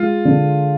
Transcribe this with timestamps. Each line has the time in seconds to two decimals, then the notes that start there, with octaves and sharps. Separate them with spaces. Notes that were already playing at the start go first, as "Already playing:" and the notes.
Already playing: G#3 F4
0.25 D3